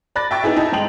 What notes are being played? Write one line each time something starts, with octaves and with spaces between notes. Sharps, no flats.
D5 B5 F#6 A6 A#6
E5 G5 C#6 A6
B3 D#4 E4 G#4 E5
D#4 E4 D#5 A5
G#2 D#5 G5 F7 F#7